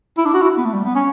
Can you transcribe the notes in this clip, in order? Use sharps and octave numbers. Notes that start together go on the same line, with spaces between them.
E4
D4
F#4
E4
B3
A3
G3
B3
C#4